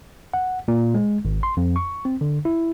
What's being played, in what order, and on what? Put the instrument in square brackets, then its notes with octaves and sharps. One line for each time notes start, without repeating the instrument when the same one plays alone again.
[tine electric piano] F#5
A#2
G#3
G#1
C6
F2
C#6
C4
D3
E4